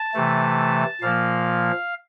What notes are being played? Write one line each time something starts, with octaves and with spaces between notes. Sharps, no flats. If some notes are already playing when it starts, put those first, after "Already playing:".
Already playing: A5
C3 E3 A3
A#2 F3 A#3 F5